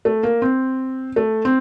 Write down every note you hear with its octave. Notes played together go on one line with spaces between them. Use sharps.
A3
A#3
C4
A3
C4